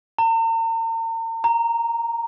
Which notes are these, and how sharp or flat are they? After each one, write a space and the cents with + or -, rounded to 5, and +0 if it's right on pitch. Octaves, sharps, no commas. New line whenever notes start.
A#5 -45
A#5 -5